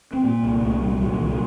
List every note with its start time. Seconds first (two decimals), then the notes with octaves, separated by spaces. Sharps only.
0.13 C4
0.24 A#2 A#3
0.43 C2
0.62 C2 A3
0.81 A#2 G3
0.97 G3
1.01 A#2 F#3
1.13 D#3
1.20 C2
1.27 F#3